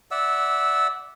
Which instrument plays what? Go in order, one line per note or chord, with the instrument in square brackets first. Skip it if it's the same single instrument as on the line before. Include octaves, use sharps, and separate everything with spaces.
[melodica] D5 E5 F#5 E6